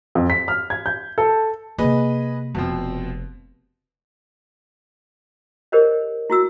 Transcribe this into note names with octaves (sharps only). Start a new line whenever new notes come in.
F2
B6
F6
G#6
G6
A4
C3 A#3 G#4 B4 D#5
F1 B2 F3 C4
G4 A#4 C5 C#5 D#5
E4 F#4 E6